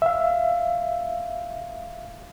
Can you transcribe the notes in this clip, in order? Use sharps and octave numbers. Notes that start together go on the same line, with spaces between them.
E5 F5